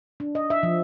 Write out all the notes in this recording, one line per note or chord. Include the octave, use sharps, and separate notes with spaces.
D4
D#5
E5
F3